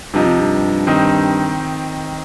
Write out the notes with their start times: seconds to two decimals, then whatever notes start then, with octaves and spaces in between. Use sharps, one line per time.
0.14 G2 C3 F3 D#4
0.26 F2
0.40 G2
0.87 D#3 C4 D#4